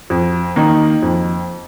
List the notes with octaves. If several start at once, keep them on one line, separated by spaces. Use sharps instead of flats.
F2
D#3 A#3 D#4
F2